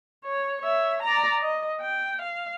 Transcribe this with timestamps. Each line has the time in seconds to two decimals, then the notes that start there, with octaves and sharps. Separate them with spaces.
0.25 C#5
0.62 C#5 E5
1.02 D5 A#5
1.41 D#5
1.81 G5
2.22 F5